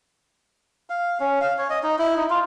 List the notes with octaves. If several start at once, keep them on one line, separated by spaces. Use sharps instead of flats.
F5
C#4
F5
C#5
D#5
D#4
E4
D#4
F4